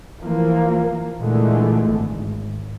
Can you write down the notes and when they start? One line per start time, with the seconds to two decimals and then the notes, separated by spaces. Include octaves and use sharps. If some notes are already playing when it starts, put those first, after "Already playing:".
0.19 E3 F3 A#3
1.19 A#2 D3 E3 G#3 A3
1.90 G#1